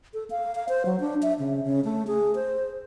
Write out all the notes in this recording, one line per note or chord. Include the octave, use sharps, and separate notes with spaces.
A4
F5
F5
C5
F#3
D4
E5
C#3
C#3
A3
G#4
C5